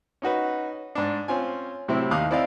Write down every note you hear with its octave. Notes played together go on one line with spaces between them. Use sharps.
C#4 D#4 F#4 B4
G#2 D4
C4 C#4 F4 G#5
A2 C3 F#3 C4 E4
D#2 D#4 F5 D6 D#6 F#6
C4 E4 D5 D#5 F5